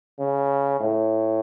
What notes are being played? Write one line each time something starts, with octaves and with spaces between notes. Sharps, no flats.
C#3
A2